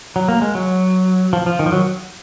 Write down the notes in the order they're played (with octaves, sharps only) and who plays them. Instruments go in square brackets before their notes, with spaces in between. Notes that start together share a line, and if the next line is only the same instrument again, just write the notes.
[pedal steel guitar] F#3
A#3
G#3
F#3
F3
F3
D#3
F3
F#3